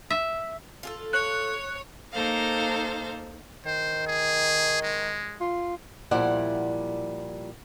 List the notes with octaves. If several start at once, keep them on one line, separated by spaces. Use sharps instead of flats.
E5
F4 G#4 A4
C#5 F#6
A#3 D#4 A4 C5 F5
D#3 C5
G#4
G#3
F4
A#2 F3 G3 E4 D5 F#5